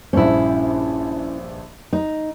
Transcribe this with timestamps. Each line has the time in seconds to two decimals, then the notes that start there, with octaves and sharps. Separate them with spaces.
0.13 A#1 G2 C#4 E4 C5
1.93 D#4